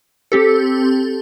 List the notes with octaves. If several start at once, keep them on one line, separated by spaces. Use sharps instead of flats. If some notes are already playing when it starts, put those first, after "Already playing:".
C4 G4 A4